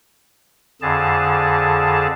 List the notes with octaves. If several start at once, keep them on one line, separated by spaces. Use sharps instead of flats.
F2 D3 G#4 A5